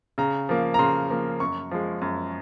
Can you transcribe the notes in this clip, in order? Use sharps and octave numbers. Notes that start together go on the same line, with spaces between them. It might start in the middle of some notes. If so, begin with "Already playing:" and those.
C#3 A#5
F3 A#3
A#5
C#3 C6
F3 A#3
F#2 C#6
F3 G#3
F#2